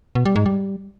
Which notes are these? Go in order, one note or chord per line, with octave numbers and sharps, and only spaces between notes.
B2
G3
G#2
G3